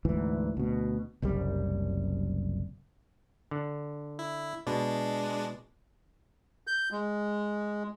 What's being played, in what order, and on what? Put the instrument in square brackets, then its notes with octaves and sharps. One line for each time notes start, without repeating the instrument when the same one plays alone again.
[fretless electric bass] D2 G#2 E3
D2 B2
F#1 C2 F#2 G3
[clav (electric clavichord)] D3
[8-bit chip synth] E4
[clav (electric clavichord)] B2 [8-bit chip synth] G#3 D4
[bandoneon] G6
G#3